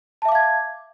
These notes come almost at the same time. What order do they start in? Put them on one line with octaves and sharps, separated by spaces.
A5 E5 D6 F5 G#6